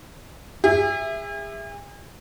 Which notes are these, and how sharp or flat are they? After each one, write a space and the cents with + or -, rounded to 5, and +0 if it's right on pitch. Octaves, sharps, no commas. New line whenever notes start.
G#4 -40 E5 +5